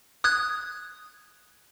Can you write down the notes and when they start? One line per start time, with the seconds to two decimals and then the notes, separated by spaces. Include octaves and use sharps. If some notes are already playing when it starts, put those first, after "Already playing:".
0.24 D#6 F#6 G#6